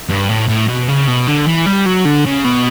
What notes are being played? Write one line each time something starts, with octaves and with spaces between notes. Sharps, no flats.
G2
A2
A2
B2
C#3
B2
D3
E3
G3
F#3
D3
C#3
B2